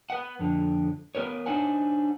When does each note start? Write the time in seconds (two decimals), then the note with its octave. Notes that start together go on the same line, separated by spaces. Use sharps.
0.10 B4 F#5
0.39 F2 D3
1.15 B3 A#4 B4 C#5
1.46 D4 D#4 C5 C#5 F#5 G#5